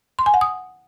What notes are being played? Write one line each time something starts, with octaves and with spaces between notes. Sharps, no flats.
C6
G#5
F#5
D#6